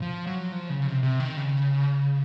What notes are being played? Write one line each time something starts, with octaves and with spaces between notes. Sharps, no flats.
F3
F#3
F3
C#3
C3
C3
D#3
C#3